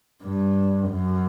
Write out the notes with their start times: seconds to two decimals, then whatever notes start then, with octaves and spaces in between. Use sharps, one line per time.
0.23 G2
0.91 F#2